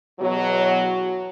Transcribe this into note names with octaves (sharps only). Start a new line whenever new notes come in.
E2 B2 F#3